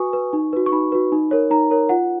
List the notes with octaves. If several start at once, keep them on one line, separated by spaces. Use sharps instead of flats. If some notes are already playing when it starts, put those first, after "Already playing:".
Already playing: F#4 B4 G#5 C#6 D#6
B4
D#4
F#4 B4
C#6
D#4 B5
F#4 B4
D#4
A#4 C#5
D#4 A#5
A#4 C#5
F4 F#5